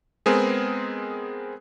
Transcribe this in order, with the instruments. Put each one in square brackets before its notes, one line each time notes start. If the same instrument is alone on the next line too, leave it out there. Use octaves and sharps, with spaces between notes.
[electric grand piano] G#3 B3 C4 G#4 A#4